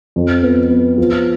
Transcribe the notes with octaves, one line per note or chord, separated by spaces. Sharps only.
F2
B3
B3
F3